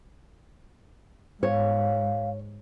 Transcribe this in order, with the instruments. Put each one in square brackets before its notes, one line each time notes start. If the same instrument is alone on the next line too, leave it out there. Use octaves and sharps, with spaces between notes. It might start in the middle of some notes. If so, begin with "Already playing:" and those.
[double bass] G#2 [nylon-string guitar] C#5 [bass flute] F5